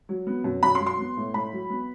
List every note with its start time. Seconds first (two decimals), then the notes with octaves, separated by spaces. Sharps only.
0.09 F#3
0.27 B3
0.44 F#2
0.63 F#2 B5
0.75 C6
0.81 F#3
0.86 C6
0.99 B3
1.17 A2
1.34 A2 B5
1.53 F#3
1.70 B3